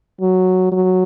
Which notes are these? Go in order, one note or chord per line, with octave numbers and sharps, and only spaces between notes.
F#3
F#3